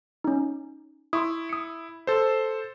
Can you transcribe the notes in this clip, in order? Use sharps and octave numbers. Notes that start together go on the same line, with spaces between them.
C#4 D#4
E4 C6 C#6 D#6
D#6 C#7
A4 C5